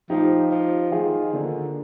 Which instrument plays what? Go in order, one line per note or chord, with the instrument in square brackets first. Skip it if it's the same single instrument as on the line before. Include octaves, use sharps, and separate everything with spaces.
[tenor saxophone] F3 [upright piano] D#4 G4
[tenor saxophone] F3
[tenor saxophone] D#3 [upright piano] F4 G#4
[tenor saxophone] D3 [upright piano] A#3 D4